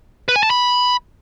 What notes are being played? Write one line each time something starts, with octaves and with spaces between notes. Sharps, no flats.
B4
G#5
A5
B5